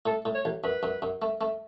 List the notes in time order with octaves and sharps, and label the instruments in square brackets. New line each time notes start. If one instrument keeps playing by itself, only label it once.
[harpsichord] A2 [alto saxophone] A4
[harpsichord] A2
[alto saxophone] C#5
[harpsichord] A1
[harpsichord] F#2 [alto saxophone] B4
[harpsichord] F#2
F#2
A3
A3